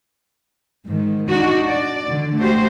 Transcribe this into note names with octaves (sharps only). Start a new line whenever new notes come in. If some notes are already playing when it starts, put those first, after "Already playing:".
G#2 D#3
D4 D#4 F#4
D5
D3
A3 F#4 G4 C5